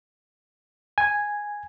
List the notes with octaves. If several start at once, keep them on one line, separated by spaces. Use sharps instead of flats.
G#5